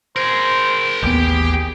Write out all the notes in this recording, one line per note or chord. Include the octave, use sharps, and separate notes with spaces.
G#4 A#4 C5
A1 D#2 B3 G4 G#4 G5